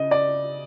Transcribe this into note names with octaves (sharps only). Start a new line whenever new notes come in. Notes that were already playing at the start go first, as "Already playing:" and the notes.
Already playing: C#3 D#5
D5